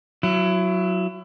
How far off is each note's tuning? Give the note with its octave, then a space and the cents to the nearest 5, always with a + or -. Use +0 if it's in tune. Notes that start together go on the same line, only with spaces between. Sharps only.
F#3 +0 E4 +30